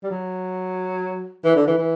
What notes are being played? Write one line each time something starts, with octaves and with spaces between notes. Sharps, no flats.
G3
F#3
E3
D3
E3
E3